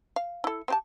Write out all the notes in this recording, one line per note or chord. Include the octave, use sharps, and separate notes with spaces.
F5
E4 A4
C4 G4 A5